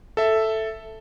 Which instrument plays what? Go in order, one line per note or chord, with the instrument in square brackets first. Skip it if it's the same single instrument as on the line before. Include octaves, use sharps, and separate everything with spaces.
[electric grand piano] A4 E5